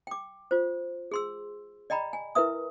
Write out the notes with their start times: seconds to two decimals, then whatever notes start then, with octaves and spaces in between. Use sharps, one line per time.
0.07 G5 D6
0.51 F4 C5
1.12 G#4 C6 E6
1.90 D5 D#5 G5 A#5 B5
2.13 G#5
2.35 E4 A#4 B4 E5 D#6